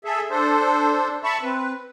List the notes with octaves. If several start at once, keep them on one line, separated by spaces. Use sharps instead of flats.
G#4 A4 E5
D4 A4 C5
E5 A5 B5 C#6
C4 B4